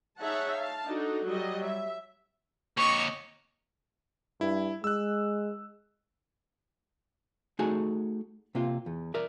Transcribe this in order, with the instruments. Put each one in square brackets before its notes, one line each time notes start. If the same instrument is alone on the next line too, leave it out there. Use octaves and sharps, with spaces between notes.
[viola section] D#4 G#4 C#5 E5 F#5 A5
F5 A5
D4 D#4 F#4 A4
F#3 G3 D#5
E5
[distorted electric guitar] A#3 C#5 [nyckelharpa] D#5 C#6
[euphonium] G2 [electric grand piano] E4
[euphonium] G#3 [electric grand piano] E6 F#6
[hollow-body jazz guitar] A3 D#4 F#4 G#4 G#5
C3 A#3 F4
E2
A#4 D5 E5